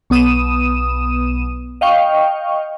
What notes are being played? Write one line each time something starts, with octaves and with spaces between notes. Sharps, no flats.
B1 B3 D#6 D#7 E7
D#5 F5 G5 C#6